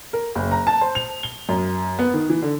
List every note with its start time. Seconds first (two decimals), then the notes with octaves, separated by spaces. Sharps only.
0.13 A#4
0.35 F#1
0.51 A#5
0.67 A5
0.81 C5
0.95 F7
1.23 G7
1.49 F#2
1.99 B3
2.14 D#3
2.30 E3
2.42 D3